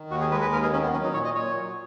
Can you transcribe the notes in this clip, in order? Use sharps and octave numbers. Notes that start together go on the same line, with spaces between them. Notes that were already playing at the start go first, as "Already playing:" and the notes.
Already playing: D#3
D#2 F#4
G#4
G#3 B4
B4
D#2 A#4
G#4
D#3 C#4
B3
F#3 C#4
D#4
A#2 C#5
D#5
A#2 C#5
F#3